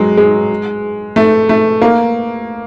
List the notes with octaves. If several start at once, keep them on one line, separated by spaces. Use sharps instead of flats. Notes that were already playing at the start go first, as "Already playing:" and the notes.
Already playing: F#3 G#3
G#3
A3
A3
A#3